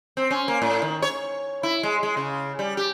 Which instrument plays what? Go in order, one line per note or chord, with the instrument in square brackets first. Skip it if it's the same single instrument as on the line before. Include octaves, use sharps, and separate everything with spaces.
[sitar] C4
C#4
A#3
A2
D#3
C#5
E4
G#3
G#3
C#3
G3
G4